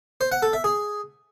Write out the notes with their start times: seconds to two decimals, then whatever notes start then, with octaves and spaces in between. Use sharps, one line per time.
0.21 C5
0.32 F#5
0.42 A4
0.53 E5
0.64 G#4